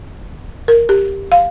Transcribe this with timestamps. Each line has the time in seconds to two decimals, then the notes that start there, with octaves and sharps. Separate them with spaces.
0.68 A#4
0.89 G4
1.32 F5